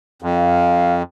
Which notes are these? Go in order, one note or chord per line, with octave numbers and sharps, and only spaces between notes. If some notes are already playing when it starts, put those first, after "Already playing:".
F2 F5